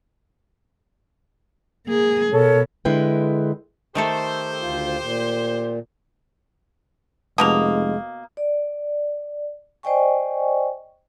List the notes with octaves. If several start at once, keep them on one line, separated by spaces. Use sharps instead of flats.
A#3 G#4
B2 A4 A#4 C#5
D3 G#3 E4 B4 G5
D#3 A3 G4 A4 C5
D2 F4
A#2
F1 B2 G#3 A#3 D#6 F7
D5
C5 D5 D#5 G5 G#5 C#6